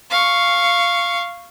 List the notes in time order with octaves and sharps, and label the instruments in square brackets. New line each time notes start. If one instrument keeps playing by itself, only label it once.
[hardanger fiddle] F5 C#6